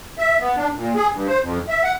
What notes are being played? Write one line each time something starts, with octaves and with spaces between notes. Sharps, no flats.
E5
B3
D4
A#2
G#4
G2
C5
F2
E5
F#5